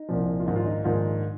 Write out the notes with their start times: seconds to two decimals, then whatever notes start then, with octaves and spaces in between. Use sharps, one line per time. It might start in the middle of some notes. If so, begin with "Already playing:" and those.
Already playing: D#4
0.09 C2 A#2 F3
0.40 F4
0.46 A#1 G#2 D#3 D#4
0.56 F4
0.66 D#4
0.84 A#1 G#2 D#3 F4